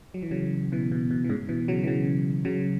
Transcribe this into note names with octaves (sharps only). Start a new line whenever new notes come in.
F#3
E3
C#3 F#3
B2 E3
B2
B2
E3
G#2 C#3
B2 E3
C#3 F#3
E3
C#3 F#3
C#3 F#3